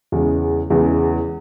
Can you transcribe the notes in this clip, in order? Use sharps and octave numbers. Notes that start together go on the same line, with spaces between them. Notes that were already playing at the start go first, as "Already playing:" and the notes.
E2 C#3 E3 G#3
E2 C#3 E3 G#3